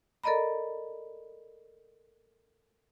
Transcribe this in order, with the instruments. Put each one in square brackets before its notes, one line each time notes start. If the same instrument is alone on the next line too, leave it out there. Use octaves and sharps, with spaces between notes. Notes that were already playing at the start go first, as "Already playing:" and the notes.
[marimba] A4 A#4 D5 D#5 A#5 B5